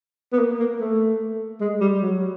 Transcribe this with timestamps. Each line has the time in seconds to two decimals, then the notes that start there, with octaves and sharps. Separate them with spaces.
0.33 B3
0.39 A#3
0.59 A#3
0.81 A3
1.61 G#3
1.81 G3
2.02 F#3